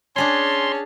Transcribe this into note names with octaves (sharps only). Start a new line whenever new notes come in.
C#4 D4 G#4 C#5 A5 C6